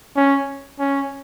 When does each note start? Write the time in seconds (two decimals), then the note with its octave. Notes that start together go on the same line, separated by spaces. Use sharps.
0.17 C#4
0.79 C#4